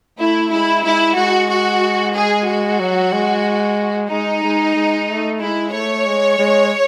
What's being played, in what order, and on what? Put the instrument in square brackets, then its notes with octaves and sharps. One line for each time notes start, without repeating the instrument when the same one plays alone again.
[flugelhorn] A3 [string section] E4
[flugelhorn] G#3 [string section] E4
[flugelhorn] G#3 [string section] E4
[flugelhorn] G#3 [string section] F#4
[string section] F#4
G#4
F#4
[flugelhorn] F#3
G#3
[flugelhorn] G#3 [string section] D#4
[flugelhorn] G#3
G#3
A3
[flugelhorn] G#3 [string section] E4
[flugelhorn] A3 [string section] C#5
[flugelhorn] G#3
G#3